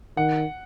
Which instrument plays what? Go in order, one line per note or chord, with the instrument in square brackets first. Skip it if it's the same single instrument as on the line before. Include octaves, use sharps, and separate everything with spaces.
[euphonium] D#3 [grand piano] F#5